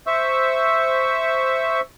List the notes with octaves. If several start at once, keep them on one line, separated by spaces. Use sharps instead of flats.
C5 E5 C#6 E6